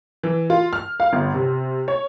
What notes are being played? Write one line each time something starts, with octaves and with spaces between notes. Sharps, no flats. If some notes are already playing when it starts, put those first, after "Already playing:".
E3
F4
F6
F5
G1
C3
C#5